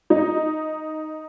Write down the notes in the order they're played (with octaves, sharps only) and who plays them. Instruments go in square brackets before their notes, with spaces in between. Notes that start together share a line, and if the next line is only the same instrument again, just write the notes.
[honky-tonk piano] D#4